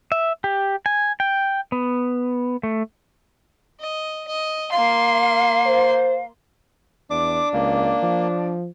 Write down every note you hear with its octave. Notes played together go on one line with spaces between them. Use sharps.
E5
G4
G#5
G5
B3
A3
D#5
D#5
A#3 F5 C6
C5
E2 D4 D6
C#2 A#3
F3